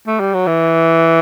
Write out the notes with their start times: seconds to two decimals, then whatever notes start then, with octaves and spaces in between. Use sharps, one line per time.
0.07 A3
0.20 G3
0.34 F#3
0.47 E3